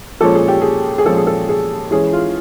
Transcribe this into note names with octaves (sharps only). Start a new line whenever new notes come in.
A#2 F3 G#3 C#4 A4
G#4
G4
G#4
G#4
A#2 F3 G#3 C#4 A4
G#4
A4
G#4
E3 G#3 C#4 G#4
F4